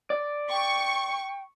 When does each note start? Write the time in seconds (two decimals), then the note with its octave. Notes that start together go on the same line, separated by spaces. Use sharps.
0.10 D5
0.50 G5 C#6